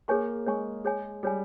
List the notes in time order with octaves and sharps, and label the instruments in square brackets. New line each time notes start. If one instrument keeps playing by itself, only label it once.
[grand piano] A#3 [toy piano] G#4 C#5 G#5 C#6
[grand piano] G#3 [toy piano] G#4 C#5 G#5 C#6
[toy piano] G#4 C#5 G#5
[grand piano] G3 [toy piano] G#4 C#5 G#5